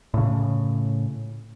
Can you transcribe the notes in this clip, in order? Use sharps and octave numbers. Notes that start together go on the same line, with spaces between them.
A2 C#3